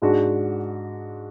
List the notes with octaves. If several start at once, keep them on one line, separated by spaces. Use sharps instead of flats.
G#2 G#3 D4 F#4